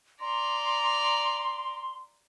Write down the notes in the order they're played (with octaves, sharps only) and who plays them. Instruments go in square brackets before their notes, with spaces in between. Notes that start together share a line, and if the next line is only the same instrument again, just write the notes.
[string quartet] D5 A#5 [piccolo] C6